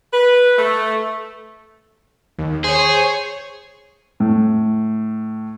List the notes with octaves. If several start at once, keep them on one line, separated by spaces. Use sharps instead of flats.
B4
A3
D#2
G#4 C5 C#5
A2